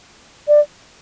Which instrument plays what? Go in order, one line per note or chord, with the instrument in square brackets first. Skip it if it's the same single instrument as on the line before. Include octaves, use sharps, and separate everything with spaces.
[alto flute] D5